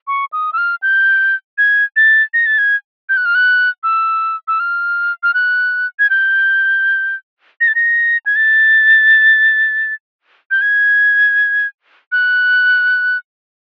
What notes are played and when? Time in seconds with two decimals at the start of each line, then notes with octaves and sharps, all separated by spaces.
0.07 C#6
0.33 D#6
0.53 E6
0.58 F6
0.82 G6
1.58 G#6
1.96 A6
2.34 A#6
2.46 A6
2.58 G#6
3.09 G6
3.17 F#6
3.25 F6
3.35 F#6
3.83 E6
4.48 E6
4.60 F6
5.23 F6
5.34 F#6
5.99 G#6
6.10 G6
7.61 A#6
7.68 A6
7.75 A#6
8.26 G#6
8.36 A6
10.51 G6
10.61 G#6
12.12 F#6